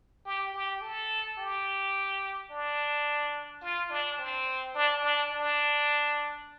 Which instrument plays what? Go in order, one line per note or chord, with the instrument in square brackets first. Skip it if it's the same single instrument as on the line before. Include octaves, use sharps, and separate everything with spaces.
[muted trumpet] G4
G4
A4
G4
D4
F4
D4
C4
D4
D4
D4